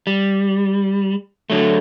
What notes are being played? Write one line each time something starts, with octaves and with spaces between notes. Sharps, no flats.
G3
D3 F#3 A3